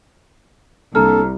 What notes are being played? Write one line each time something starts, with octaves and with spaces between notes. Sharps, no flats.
C2 A#3 C4 D4 A4 A#5 F6